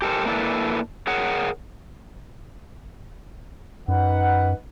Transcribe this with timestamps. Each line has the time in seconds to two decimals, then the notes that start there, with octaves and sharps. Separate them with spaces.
0.02 G4 A4 A#4 C5
0.26 A#3 D4 E4 G#4 A4 B4
1.07 G#4 A#4 C#5 F#5
3.88 F#2 D#4 B4 F#5